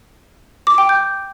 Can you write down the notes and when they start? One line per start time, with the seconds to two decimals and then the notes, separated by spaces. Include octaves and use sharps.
0.67 D6
0.78 G5
0.89 G6